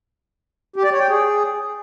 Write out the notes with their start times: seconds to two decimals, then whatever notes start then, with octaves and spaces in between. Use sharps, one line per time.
0.76 G4
0.84 D5
0.92 C#5
1.00 G5
1.09 G#4